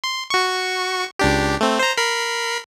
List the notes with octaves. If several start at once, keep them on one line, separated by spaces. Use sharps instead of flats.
C6
F#4 C#6
C#2 D4 G4
A3 C4
C5 A#5
A#4 B5 C7